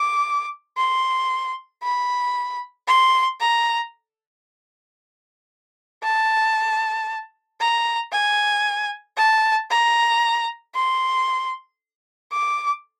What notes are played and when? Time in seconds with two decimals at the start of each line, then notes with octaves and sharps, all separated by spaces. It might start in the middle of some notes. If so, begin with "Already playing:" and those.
Already playing: D6
0.77 C6
1.83 B5
2.88 C6
3.40 A#5
6.03 A5
7.60 A#5
8.12 G#5
9.17 A5
9.70 A#5
10.75 C6
12.32 D6